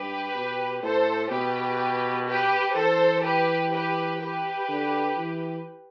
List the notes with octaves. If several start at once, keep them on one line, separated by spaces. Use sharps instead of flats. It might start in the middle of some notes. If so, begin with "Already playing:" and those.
Already playing: G2 G4 B4
B2
A2 A4 C5
B2 G4 B4
G4 B4
E3 A4 C5
G4 B4
G4 B4
G4 B4
D3
E3